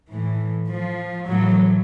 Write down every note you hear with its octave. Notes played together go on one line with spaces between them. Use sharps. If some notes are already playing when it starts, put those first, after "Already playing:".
A2 E3
F3
A2 E3 F#3